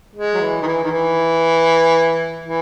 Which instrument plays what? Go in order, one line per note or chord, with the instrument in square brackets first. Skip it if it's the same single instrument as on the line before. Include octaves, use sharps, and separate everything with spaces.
[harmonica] G#3
F#3
E3
D#3
E3
D#3
E3
E3